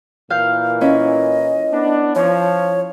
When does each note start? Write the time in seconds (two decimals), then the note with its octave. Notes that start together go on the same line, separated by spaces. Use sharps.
0.30 A#2 E3 A#4 F5 G6
0.81 C#4 E4 D#5
1.72 B3 D4
2.15 F3 C#5